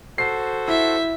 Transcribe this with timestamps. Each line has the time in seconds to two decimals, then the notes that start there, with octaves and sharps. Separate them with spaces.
0.18 F#4 A4 C5 C7
0.68 E4 E5